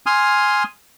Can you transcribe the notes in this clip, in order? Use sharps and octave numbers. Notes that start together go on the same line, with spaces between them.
G#5 C6 D#6 F6